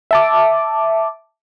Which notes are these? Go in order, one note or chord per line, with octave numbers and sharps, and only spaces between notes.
E5 A5 D6